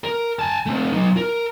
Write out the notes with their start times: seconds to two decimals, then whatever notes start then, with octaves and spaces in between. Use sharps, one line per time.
0.04 A#4
0.39 G#5 A5
0.66 A3 C4
0.92 F#3 D#4
1.17 A#4